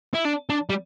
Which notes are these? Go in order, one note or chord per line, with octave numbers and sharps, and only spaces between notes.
E4
D4
D4
G3